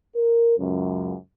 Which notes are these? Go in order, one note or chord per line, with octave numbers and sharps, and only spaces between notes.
A#4
C#2 F#2